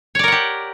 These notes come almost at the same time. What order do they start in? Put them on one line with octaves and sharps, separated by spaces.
C#5 D5 A#4 F#5 G4